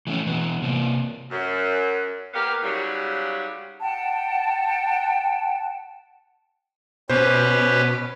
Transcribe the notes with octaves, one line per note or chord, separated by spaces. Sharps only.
E3 A3 C#4
B2 E3 B3
C3 A#3
F#2
A#3 B3 G4 A#4 F5
G#2 C#3 F#3 G3
F#5 G5 A5
B2 C#4 G4 B4 C5